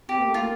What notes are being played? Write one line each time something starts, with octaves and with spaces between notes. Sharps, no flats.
C4 G4
A#3
A3
A#3 F4